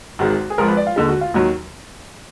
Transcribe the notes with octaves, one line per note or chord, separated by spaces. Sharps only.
G#1 G#2 D#3 G#3 F#4
G#4
G#1 G#2 F3 A#4
B4
D5
F4
D#2 D3 G#3
F#4
F4
D#2 D#3 F#3 F#4